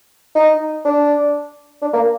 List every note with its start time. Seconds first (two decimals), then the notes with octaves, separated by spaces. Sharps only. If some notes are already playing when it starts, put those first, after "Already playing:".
0.35 D#4
0.85 D4
1.82 D4
1.93 A#3